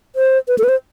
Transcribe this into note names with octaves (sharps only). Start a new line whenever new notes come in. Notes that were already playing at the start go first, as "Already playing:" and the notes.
C5
B4
A4
B4
C5